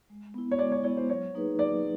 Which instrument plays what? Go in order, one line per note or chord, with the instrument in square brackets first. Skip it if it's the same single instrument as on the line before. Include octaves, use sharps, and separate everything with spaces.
[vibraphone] G#3
B3 E4
[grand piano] C#5
[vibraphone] G#3 [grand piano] D5
[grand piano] C#5
[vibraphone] B3 E4 [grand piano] C#5
[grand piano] C5
[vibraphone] F#3 [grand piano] C#5
[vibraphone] A#3 D#4 G#4 B4
[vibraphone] F#3 [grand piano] D5